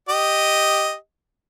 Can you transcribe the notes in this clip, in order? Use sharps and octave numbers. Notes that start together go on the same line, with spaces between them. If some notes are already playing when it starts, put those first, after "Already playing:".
G4 D#5